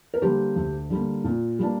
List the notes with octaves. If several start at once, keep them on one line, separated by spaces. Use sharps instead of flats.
A#4
D3 G3 A#3 G4 C5
D2
D3 G3 A#3
A#2
G3 A#3 D4